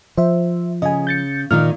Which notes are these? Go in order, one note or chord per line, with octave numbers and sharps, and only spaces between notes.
F3 C5 E5
C#3 D#5 G#5
G6 A6 C#7
A#2 D#3 D#4 F6